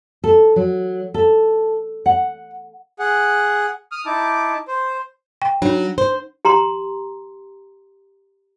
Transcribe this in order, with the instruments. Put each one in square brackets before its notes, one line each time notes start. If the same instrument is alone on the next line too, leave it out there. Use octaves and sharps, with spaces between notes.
[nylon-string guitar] A4
F#3
A4
F#5
[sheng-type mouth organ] G#4 F#5
D#6 F6
D#4 E4 A5 D6
C5
[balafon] G5
[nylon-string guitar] F#3 [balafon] D4 D#4
[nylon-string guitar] C5
[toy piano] G4 A#5 C6